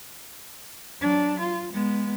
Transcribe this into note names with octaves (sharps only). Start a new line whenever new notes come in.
F#3 D4
F4
G#3 B3